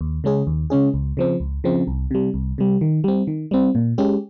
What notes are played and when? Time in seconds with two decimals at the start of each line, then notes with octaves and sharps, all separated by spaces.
0.01 D#2
0.24 C#3 G#3 C#4 G#4
0.47 D#2
0.70 C#3 G#3 C#4 G#4
0.94 C#2
1.17 C#3 F3 C4
1.40 C#2
1.64 C#3 F3 C4
1.87 C2
2.11 C3 G3
2.34 C2
2.58 C3 G3
2.81 D#3
3.04 G3 C4
3.27 D#3
3.51 G3 C4
3.75 A#2
3.98 G#3 C#4 G4